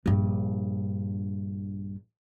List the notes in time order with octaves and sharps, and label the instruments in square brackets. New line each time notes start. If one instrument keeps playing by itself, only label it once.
[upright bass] A#1 G2